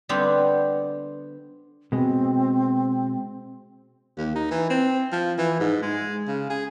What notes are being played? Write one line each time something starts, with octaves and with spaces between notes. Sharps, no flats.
D3 G3 B3 C4
B2 G#3 C4
D#2
D#4
E3
C4
F3
E3
G#2
G#3
C#3
G#4